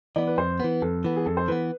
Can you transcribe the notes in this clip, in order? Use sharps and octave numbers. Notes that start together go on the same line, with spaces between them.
E3 B3 D5
B4
F2 C5
E3 B3 B4
F2 A4
E3 B3
G#4
F2 A4
C5
E3 B3 B4